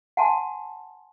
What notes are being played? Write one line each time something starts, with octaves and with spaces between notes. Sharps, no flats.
F#5 G#5 A5 C6